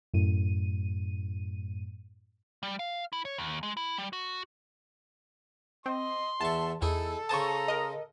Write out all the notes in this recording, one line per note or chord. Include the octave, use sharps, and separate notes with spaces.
F#2 A2 D#7
G3
F5
E4
C#5
D#2
G#3
E4
G3
F#4
C4 D#5 C6
E2 E5 A5 C#6
E2 D#4 E4 G#4 A4
C#3 C5 A5 A#5 C#6 D#6
A#4 D#5